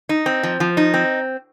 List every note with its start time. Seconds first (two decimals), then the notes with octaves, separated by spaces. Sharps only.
0.09 D#4
0.26 C4
0.43 F3
0.60 F3
0.77 D#4
0.94 C4